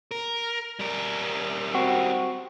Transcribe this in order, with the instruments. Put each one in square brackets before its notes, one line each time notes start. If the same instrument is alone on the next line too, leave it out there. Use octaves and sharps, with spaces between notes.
[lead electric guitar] A#4
G3 A#4
[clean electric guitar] C4 F#4